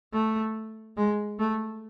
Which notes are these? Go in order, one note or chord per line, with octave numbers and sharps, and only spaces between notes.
A3
G#3
A3